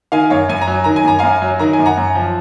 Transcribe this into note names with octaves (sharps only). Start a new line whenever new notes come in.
D#3 F5 G#5
F#2 C#5 F5
F#2 G#5
A#5
F#3 G#5
D#3 A#5
G#5
F#2 A#5
F#2 F5 G#5
F#3
D#3 A#5
G#5
F#2
F#5 A#5
F#2
F3